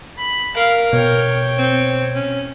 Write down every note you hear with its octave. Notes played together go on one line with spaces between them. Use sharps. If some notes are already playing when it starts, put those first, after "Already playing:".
B5
A#4 F5
B2 C#5 G5
C4
C#4